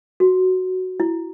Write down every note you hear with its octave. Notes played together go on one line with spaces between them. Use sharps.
F#4
E4